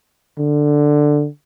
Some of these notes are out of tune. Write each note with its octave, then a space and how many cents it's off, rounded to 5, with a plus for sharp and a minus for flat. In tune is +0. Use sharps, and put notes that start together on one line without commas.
D3 +5